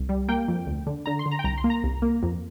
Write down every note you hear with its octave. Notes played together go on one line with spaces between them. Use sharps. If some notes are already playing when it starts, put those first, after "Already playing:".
Already playing: C2
G3
A#3 G5
F2
D2
D3
D3 A#5
C6
D3
A#5
G5
C2 A#5
C6
A#3
A#5
C2
A#3
F2